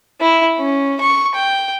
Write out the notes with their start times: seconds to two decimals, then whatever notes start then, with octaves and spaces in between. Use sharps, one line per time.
0.21 E4
0.58 C#4
1.00 C#6
1.35 G5